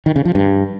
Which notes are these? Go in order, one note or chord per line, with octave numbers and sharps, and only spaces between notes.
D#3
C#3
F3
G2